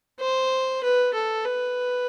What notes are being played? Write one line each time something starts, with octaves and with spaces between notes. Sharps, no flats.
C5
B4
A4
B4